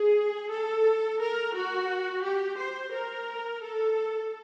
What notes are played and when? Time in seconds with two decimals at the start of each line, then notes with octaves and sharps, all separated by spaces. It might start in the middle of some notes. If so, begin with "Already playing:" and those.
Already playing: G#4
0.50 A4
1.20 A#4
1.54 F#4
2.24 G4
2.57 C5
2.92 A#4
3.62 A4